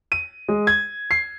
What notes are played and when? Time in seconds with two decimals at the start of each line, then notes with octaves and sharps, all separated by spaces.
0.12 D#7
0.49 G#3
0.67 G#6
1.11 C7